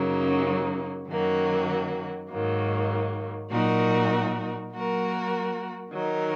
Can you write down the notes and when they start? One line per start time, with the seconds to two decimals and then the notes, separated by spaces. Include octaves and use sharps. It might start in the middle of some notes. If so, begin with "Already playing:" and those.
Already playing: F#2 C#3 F#3 A#3 D#4
1.09 F#2 D#3 F#3 A#3 F#4
2.30 G#2 D#3 F#3 A#3
3.51 A#2 F#3 D#4 F#4 A#4
4.72 F#3 A#3 F#4 A#4
5.92 D#3 F#3 D#4 A#4